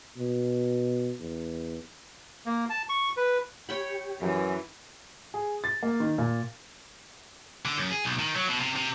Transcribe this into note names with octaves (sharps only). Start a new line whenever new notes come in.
B2
E2
A#3
A5
C#6
B4
G4 C#5 G5 B5
F#2 E3
G#4
A6
A#3
D#3
A#2
D3
F#2
G#4
B1
D#3
F#3
B2
C3
C3